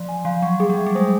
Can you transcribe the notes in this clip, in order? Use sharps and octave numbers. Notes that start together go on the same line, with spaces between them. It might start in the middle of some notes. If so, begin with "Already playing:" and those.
Already playing: F3 D5
G#5
F3 F5
F#3 C#6
G3 G#4
F#3
E5
G3
G#3 C5